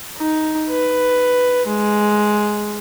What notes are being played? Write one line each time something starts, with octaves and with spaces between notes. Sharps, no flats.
D#4
B4
G#3